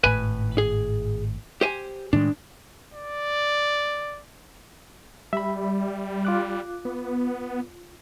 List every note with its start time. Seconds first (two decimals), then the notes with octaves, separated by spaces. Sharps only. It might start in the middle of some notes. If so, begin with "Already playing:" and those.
0.04 G#1 A2 B4 G#5 B5
0.58 G#4
1.61 G4 C5 G#5
2.13 A2 D#3 G#3 D4
2.94 D5
5.33 G3 E5 B5
6.25 F4 D6 F#6
6.85 B3